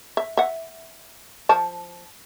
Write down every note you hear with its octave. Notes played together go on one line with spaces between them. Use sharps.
E5
E5 F#5
F3 A5